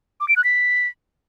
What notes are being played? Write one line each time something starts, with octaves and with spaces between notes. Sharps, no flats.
D6
D7
F#6
B6